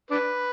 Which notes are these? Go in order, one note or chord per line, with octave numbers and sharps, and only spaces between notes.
D4 B4